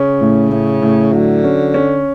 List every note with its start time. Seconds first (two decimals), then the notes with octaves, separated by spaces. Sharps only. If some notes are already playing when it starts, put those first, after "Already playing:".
Already playing: C#3 C#4
0.21 A2
0.51 A2
0.82 A2
1.12 D3 F#3
1.44 C#4
1.74 C#4